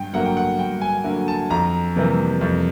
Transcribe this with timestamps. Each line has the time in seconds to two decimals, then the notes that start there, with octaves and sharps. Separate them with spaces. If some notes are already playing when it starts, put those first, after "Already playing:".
Already playing: G2 G5
0.13 D3 F#3 A#3 F#5
0.25 G5
0.37 F#5
0.59 G2 G5
0.81 G#5
1.04 D3 F#3 A#3
1.28 A5
1.50 F2 A#5
1.96 C3 E3 G3 A#3
2.41 F2